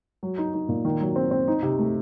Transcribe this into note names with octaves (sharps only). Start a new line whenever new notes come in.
F#3
D#4
D#4
A#2
D#3
F#3
C4
C4
D#4
C3
A3